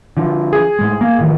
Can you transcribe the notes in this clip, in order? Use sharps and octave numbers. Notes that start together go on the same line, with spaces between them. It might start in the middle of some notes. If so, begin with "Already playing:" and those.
D3 F3
G#4
A2 G#3
A#3
A2 D#3 F3